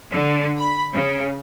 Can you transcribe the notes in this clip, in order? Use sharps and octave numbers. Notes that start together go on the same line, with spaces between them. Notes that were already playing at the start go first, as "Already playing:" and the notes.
D3
B5
C#3